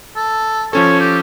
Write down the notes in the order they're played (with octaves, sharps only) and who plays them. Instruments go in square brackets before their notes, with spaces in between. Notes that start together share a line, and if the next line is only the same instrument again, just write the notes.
[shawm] A4
[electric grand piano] F3 C#4 A4 [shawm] C#5
[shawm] G4